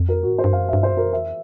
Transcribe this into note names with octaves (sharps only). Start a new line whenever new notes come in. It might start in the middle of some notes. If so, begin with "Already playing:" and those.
Already playing: F2
A#4
F#4
A2
G#2 C5
G2
F#2 F5
E5
G2
C5
F#2 A#4
F2 E5